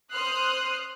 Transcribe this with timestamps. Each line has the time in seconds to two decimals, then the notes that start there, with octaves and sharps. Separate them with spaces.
0.12 C5 D#6 F6 F#6 C7